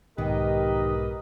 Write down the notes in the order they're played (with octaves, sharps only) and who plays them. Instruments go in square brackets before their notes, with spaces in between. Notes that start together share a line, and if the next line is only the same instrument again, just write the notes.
[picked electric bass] B1 G#2 [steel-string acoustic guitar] D#3 [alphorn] G4 [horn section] A#4 B4 D#5